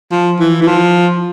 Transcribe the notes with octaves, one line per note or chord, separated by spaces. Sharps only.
F3
E3
E3
F3